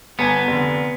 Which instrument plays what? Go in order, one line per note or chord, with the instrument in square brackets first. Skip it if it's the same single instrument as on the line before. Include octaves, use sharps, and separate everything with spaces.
[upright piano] G1 G#5 G#6 [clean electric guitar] B3
[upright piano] F1 D3